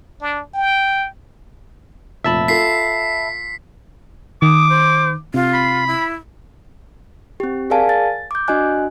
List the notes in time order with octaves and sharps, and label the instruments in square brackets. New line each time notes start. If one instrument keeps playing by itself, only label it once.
[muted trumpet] D4
G5
[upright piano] F1 A#2 [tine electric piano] E5 A5 B5
[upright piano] F4 A4 [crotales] B6 C7
[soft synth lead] D#3 [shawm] D6 [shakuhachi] D#6
[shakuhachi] C5
[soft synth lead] C3 [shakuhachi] F4
[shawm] B5
[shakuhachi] E4
[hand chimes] C4 G4
G#4 A#4 D5 F5 G#5 A5
A6
D6 G6
D4 F#4 D#5 G#5 F#6